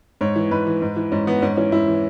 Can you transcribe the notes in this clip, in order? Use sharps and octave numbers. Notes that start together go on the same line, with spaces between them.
G#2 C#5
E3
G#2 B4
E3
G#2
E3
G#2 C#4
E3 B3
G#2 C#4
E3 C#4
G#2 E4
E3